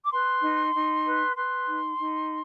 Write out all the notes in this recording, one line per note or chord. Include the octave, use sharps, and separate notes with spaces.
D6
B4 C6
D#4
D#4
B4
B4 C6
D#4
D#4